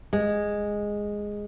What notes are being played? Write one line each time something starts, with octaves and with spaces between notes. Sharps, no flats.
G#3